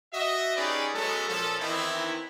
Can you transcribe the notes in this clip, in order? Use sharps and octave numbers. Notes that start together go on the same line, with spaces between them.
F#4 D#5 E5
C#4 D#4 G4 G#4 B4 D5
F#3 G#3 B3 C#4 A4
A#2 F3 C#4 A4
D#3 E3 B3 C4 D#4 E4